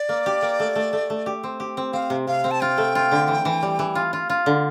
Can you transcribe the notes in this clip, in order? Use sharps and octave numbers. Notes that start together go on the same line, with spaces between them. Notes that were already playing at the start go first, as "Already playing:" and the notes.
Already playing: D5
A#3
G4
A#3
A3
A3
A3
A3
G4
C4
G4
C4
C4 F5
C3
C3 F5
C4
A5
F4 G5
A3
F4
D3
E3
E3
G3
E3
F4
F4
F4
D3